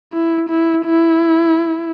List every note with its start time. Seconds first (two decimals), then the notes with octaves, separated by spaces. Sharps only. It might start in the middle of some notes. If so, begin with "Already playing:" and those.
0.13 E4
0.50 E4
0.86 E4